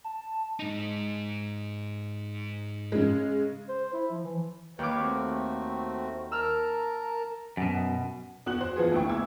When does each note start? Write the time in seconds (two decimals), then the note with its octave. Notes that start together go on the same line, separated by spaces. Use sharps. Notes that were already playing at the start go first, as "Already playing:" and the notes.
0.04 A5
0.59 G#2 D#4
2.92 C#3 G#3
3.69 C5
3.93 E4
4.11 F3
4.25 E3
4.79 D#2 B4 C#5 F5 D6
4.99 A3 C4 F#4
6.32 A#4 A5 A#5 E6 F6
7.57 F#2 B2
8.46 E2 F#4 F#6 F#7
8.61 C5
8.76 E3 F3 B3 G#4
8.92 D2 E4 G5 C#6
9.09 D2 B2 D6 E6 G#6